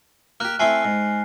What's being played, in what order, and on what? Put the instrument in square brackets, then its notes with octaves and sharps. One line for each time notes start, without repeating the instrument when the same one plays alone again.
[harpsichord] A#3 G4 [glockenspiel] F6 F#6
[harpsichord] A3 C4 E4 [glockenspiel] G#5 C7
[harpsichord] G#2